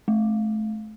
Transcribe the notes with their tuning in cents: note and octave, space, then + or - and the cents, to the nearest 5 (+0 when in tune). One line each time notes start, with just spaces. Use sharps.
A3 -30